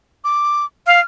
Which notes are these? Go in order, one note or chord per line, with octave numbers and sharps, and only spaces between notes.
D6
F5 F6